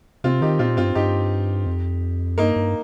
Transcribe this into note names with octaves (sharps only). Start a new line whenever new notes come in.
C3 C4 F4
D#3 D#4 G4
A#2 C4 F4
G2 C4 F4
G2 D#4 G4
F2
G2 A#3 D#4
G2